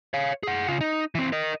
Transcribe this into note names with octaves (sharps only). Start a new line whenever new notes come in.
C#5 F5
G#4 F#5
C#3 F4
D#4
E3 C4
A#4 D#5